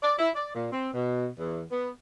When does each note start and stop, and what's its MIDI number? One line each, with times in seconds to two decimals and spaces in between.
0.03 0.13 74
0.19 0.29 64
0.35 0.54 74
0.55 0.67 46
0.72 0.89 60
0.94 1.27 47
1.38 1.61 40
1.71 1.89 59